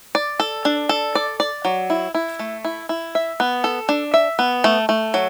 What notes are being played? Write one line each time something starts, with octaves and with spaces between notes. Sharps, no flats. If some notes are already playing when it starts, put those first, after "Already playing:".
D5
A4
D4
A4
D5
D5
F#3
E4
E4
A3
E4
E4
E5
B3
A4
D4
E5
B3
A3
A3
F#3